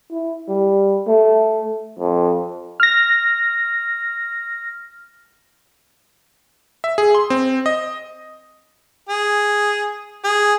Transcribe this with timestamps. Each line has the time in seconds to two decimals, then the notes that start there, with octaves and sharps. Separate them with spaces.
0.12 E4
0.48 G3
1.08 A3
1.99 F2
2.80 F6 A#6
6.84 E5
6.98 G#4
7.15 C6
7.30 C4
7.66 D#5
9.09 G#4
10.24 G#4